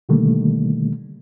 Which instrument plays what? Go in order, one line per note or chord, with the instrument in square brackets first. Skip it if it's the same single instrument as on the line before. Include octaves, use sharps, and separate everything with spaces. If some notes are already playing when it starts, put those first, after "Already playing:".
[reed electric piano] B2 D3 D#3 G3 A3 A#3